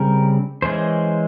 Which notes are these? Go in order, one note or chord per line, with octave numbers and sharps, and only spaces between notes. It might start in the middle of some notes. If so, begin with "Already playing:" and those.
Already playing: C#3 G3 C4 A#4
E3 G#3 C#4 C5